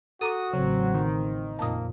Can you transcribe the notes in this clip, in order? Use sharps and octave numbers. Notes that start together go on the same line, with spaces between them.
F#4 A4 A#5 D6 D#6
A1 C#3 F#3 C4
D#3
F2 A#2 A#3 A5 D#6